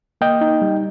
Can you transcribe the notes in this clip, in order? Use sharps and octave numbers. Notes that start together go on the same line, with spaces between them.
A#3 D#5 G5
D#4
G3